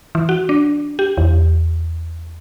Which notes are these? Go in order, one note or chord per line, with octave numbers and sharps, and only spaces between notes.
E3
F#4
D4
G4
E2